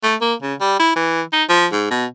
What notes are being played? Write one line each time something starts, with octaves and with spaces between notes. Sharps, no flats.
A3
A#3
C#3
G3
E4
E3
D#4
F3
G#2
B2